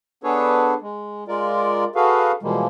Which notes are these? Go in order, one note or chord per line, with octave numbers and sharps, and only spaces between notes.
B3 D4 G#4 A4 B4 C#5
G#3
G#3 F4 A#4 D5
F#4 G#4 A4 B4 F5
B2 E3 F3 G3 G#3 A#3